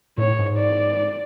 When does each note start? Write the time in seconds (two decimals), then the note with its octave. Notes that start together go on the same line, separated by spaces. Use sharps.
0.18 A2 C#5
0.39 G#2
0.58 D5